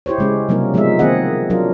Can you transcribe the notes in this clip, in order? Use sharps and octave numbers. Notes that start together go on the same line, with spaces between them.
E4 G4 C5 C#5
C#3 G#3 C#4
C3 F#3 G3 A#3 D#4 A#4
F3 G#3 B3 D#4 E5
D#3 A#3 C4 G#4 D#5 F#5
F#3 D4 F4 A#4